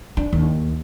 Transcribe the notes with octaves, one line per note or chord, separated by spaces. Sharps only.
D4
D#2